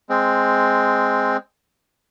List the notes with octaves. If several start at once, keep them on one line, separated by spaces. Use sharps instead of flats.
G#3 C4